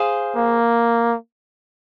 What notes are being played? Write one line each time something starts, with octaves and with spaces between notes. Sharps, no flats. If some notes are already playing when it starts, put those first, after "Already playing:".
Already playing: G#4 C5 F5
A#3